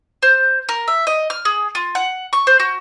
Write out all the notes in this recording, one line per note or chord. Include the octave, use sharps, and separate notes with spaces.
C5
A#4
E5
D#5
F6
G#4
F4
F#5
C#6
C5
F#4